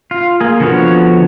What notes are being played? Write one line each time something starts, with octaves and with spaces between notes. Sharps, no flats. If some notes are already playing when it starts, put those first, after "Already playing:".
F4
A#3 G#4
D3 F3 B3 F#4 C#5